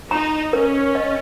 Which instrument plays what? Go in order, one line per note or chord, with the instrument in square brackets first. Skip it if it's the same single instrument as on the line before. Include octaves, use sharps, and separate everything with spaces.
[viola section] D#4 [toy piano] A#5
[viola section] C#4 [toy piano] A#4
[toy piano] D#5